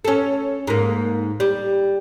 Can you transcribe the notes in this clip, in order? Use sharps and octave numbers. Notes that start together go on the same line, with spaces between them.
C#4 A4
G#2 A#3
G3